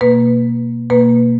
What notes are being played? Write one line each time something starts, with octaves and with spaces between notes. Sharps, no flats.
B2 A#3 B4
B2 A#3 B4